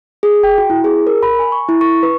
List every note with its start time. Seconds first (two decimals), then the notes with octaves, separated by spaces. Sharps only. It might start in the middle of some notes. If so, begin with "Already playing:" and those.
0.23 G#4
0.43 G5
0.58 F#4
0.70 E4
0.84 G#4
1.07 A#4
1.23 B5
1.39 G#5
1.52 C#6
1.69 E4
1.81 C#6
2.03 B4